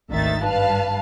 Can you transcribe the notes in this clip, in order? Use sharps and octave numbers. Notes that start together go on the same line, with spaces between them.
G#1 D2 D#3 E5 A6
G2 B4 F5 A5